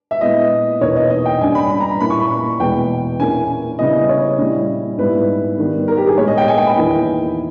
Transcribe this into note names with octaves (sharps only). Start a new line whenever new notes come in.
E5
A#2 G#3 B3 E4 D#5
E2 B2 A#3 D#4 C#5
D#5
D#5
G5
G2 G3 C#4 G#5
B5
B5
A#5
A#2 A#3 C#4 E4 B5
C#6
B5
E2 B2 G#3 G5
A#2 A#3 C#4 E4 G#5
C#3 G3 B3 E4 D#5
C#5
A#2 G3 C#4 E4
G#2 G3 B3 E4 B4
D#3 G3 B3
A#4
G4
G#4
A#2 G#3 B3 C#5
D#5
G5
G#5
G5
B5
E2 D#3 A#3 E4